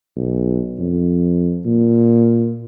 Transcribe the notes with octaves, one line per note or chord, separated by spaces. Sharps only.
B1
F2
A#2